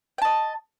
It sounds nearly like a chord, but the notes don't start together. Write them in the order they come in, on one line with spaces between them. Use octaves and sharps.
G5 A5 D#5